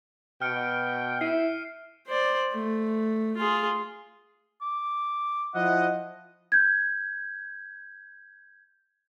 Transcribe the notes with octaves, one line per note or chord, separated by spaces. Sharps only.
B2 G5 F6 C#7 D7
E4 C7 D#7
C5 D5
A3
F4 G#4
D6
F3 E4 D#5 F#5
G6 G#6